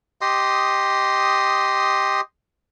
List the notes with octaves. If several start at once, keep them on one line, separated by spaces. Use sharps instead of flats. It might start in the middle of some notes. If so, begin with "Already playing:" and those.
G4 D#5 C6 D#6